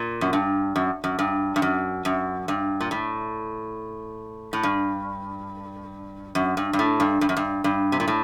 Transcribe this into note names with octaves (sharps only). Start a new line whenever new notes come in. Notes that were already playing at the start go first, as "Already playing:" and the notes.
Already playing: A#2
F#2
G2
F#2
F#2
G2
G2
F#2
F#2
G2
A#2
A2
A2
G2
F#2
G2
G2
A2
G2
G2
F#2
G2
G2
C3
A#2
A2